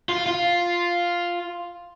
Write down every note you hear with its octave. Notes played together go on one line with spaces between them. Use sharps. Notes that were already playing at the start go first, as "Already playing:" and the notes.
F4
F4